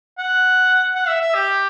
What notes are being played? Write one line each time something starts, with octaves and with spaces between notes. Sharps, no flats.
F#5
F#5
E5
E5
G4